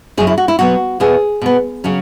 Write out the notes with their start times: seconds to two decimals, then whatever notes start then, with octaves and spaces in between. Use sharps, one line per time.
0.17 F#2 C#3 F#3 G#4
0.27 E4
0.38 F#4
0.48 E4
0.59 B2 F#3 B3 F#4
1.00 E2 B2 B3 G#4
1.42 B2 B3
1.84 C#3 F#3 C#4